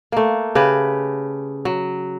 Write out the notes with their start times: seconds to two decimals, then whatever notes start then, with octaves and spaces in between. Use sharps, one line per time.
0.12 A3 A#3
0.55 C#3 G4 B4
1.65 F#3